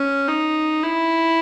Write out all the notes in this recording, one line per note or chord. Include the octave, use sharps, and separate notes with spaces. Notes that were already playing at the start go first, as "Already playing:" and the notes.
Already playing: C#4
D#4
E4